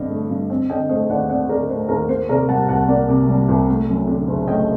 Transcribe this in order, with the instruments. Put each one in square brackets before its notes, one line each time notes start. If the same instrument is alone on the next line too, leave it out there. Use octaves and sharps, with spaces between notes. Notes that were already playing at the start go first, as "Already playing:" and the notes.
Already playing: [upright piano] G2 D3 C4 D#5
A3
G2
C4
D3 D#5 G5
A3 C5 D#5
D#2 D5 F#5
C4 D5 F#5
D3 A#4 D5
A3 C5
D#2 A#4
A#3 C5
C3 A#4 D5
G3 F#5 A5
C2 F#5 A5
A#3 D5 F#5
C3
G3
C2
A3
F#2
D3
F#1
A3 D#5 G5